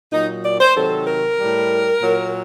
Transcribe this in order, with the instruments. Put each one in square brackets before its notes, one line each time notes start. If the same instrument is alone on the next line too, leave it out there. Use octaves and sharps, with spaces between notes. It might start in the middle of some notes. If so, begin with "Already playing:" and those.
[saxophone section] A#2 F#3 D#4
D5
C5
C3 D#3 F#3 A4
A#4
A2 G3
A#2 F#3